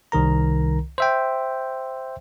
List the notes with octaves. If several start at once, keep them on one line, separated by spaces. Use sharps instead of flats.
C2 D#3 A#4 A#5
C5 E5 G5